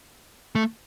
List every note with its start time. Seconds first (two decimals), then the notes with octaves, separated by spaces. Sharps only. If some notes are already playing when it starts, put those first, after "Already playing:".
0.55 A3